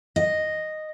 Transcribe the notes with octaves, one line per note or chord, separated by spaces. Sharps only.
D#5